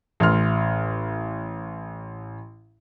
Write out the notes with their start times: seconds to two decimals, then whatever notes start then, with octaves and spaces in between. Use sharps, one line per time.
0.20 A1 C6 F6